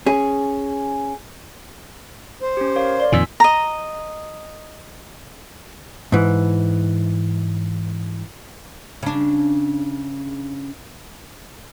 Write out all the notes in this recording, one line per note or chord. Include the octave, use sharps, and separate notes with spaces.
C#4 G#4
C5
C#4 G4
A#4 C#5 F5
D5 C6
F2 A#2 D#3 G#5 E6 B6
D#5 A#5
G#2 E3
C#3 D4